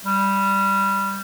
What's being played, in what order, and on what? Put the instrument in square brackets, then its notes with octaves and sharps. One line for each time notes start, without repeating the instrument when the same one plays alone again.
[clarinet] G3